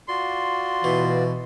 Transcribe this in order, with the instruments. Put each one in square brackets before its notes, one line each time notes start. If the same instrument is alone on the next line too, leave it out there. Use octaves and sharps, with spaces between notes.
[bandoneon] F4 F#4 D5 [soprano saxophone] C6
[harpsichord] B2 [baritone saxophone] E3